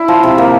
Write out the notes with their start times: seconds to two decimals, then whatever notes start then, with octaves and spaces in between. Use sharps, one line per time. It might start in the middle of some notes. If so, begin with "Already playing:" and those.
Already playing: E4
0.08 F3
0.23 C3
0.38 A#3